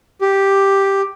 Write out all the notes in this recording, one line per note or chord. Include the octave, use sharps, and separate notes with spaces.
G4